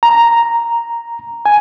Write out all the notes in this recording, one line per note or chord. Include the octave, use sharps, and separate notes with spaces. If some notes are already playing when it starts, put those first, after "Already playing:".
A#5
G#5